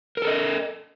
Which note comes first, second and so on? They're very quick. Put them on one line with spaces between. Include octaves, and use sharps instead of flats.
A#4 A4 D#5